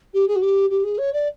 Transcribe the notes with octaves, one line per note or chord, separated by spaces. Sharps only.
G4
G#4
F#4
G4
G4
G#4
C#5
D5